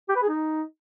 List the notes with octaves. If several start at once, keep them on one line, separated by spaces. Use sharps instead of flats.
G4
B4
G#4
D#4